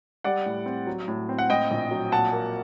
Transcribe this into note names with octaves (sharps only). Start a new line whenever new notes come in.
G3 D5 F#5
A2
C4
F#3
A2
C4
F#5
A2 D#5 G5
A#1
F#3
A#2 F#5 A5
A#3